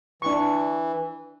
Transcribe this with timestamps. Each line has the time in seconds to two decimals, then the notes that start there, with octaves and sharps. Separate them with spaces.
0.22 E3 D4 C#6